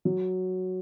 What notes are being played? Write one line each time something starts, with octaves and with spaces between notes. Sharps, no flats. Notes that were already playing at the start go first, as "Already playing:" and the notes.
F#3